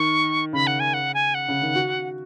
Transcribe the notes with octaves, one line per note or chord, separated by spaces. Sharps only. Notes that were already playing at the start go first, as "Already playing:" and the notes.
Already playing: D#3 C#6
C#3 B5
F#5
G#5
F#5
G#5
F#5
C#3
D#3
F#4